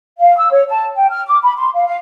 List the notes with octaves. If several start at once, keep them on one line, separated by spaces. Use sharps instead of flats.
F5
E6
C#5
A5
G5
F6
D6
B5
C6
F5
F5